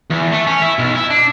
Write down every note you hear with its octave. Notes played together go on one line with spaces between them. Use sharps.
E2
A3
C#4
E4
B1
E4
D4